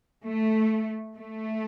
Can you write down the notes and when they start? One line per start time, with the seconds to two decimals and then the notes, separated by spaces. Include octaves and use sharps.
0.24 A3
1.15 A3